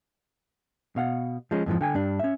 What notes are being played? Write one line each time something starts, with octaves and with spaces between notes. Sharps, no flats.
B2 F5 F#5
F3 G#3 C#4
F2 G#2 E3 F3
D3 G5 G#5
G2 D4
C#4 E5